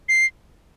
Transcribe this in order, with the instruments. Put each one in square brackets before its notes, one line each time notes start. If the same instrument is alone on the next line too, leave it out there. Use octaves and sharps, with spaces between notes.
[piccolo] C7